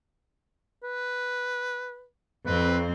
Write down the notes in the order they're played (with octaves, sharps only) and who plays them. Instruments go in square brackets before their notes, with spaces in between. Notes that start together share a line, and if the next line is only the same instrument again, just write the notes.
[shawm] B4
[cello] F2 C4 [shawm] B4